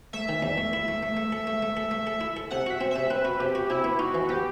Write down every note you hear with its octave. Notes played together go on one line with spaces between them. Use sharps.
A3 E5
D#3
E2
A3
E4
A3
A3
A3
A4
A3
A3
A4
A3
A4
E4
A4
C3 F#5
F#4 E5
C4
C3 E5
C4 B4
F#4
C3 G4
F#4
C3 E4
B3
D#4 F#4
E3
B3 G4